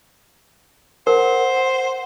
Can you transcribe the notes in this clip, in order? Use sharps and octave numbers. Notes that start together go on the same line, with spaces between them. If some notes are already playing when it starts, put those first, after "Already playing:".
A#4 C5 F#5